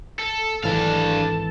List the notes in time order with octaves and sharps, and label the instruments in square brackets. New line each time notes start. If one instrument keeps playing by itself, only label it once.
[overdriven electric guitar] A4
[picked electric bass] G#1 E3 [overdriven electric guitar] D4 F5 [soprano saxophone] A4